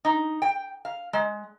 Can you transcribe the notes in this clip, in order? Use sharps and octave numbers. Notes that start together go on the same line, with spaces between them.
D#4
G5
F5
G#3